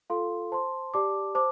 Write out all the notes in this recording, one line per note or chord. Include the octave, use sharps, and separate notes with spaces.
F4 A4 F5 C6
C5 A5 C6
G4 D5 A5 D6
C5 A5 D6